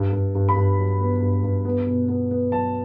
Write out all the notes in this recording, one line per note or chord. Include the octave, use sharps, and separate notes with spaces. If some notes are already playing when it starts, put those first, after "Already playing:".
Already playing: G2
G2
G2
B5
G2
F#3
B3
G2
G2
B3
B2
B3
B3
F#3 A5